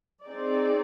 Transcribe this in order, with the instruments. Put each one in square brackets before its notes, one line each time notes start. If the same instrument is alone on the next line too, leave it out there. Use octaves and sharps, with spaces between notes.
[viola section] C4 D#4 G#4 D5